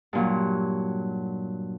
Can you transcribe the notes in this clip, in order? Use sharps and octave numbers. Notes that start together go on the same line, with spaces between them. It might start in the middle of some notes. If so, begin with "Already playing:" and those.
G2 A#2 F#3